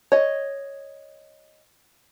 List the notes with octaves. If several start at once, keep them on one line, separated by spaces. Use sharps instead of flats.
C#5 D#5